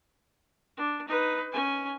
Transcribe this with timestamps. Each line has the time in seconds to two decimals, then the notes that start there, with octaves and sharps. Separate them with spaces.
0.77 D4
1.08 D#4 B4
1.52 C#4 G#5